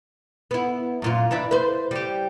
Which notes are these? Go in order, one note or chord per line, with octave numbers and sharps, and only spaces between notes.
B3 E4
F#2 A#2 F4
E3 D4 E5
B4 C5
G3 G4